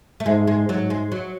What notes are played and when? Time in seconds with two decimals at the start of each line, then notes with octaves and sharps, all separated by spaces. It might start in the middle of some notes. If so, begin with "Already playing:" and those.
0.20 A3
0.26 G#2 G#3
0.47 G#3
0.69 G#2 F#3
0.90 G#3
1.12 F#3